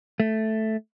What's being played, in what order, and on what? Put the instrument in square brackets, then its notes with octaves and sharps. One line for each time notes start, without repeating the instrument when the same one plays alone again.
[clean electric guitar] A3